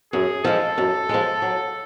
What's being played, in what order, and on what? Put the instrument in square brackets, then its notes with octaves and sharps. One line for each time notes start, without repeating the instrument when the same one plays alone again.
[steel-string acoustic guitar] F#2 [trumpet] G#4
[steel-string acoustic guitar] F3 G#3 [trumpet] A4
[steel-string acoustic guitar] F#2
F3 G#3
F#3